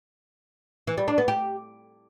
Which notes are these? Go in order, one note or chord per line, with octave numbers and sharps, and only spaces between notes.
E3
G3
D4
B3
G4